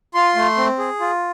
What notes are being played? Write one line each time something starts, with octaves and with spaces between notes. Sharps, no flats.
F4 C6
A3
C4
G#4
F4